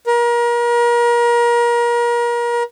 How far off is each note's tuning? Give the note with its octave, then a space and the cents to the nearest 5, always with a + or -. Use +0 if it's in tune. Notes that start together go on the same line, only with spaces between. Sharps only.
A#4 +35